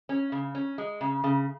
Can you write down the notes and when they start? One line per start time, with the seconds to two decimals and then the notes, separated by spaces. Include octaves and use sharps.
0.09 C#4
0.32 C#3
0.55 C#4
0.78 G#3
1.01 C#3
1.24 C#3